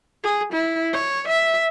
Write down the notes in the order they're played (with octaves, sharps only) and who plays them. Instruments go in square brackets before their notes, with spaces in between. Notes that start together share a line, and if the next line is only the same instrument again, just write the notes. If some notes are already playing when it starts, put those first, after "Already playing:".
[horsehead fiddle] G#4
E4
C#5
E5